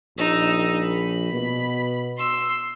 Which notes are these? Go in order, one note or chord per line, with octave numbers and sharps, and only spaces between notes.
A#1 D#4 E6
B5
B2
C6 E6